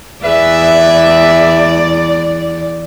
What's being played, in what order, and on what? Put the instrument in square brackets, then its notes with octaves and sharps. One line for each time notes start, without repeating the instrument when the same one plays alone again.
[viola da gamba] E2 D5 [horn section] G#4 B4 E5